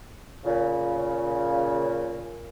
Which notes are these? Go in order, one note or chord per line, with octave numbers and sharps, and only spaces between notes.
A#2 C#3